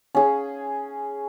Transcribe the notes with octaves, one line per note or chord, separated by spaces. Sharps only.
C#4 G#4